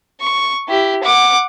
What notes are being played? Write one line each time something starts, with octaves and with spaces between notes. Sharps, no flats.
C#6
E4 G4
F#5 D6